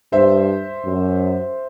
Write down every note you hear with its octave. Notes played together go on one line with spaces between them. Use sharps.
G2 C5 E5
F#2